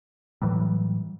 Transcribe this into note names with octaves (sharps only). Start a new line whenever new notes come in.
A2 E3 F#3 G3